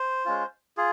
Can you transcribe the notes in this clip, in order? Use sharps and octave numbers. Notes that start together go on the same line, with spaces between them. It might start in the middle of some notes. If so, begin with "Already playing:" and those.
Already playing: C5
G#3 C#4 F4
F4 G#4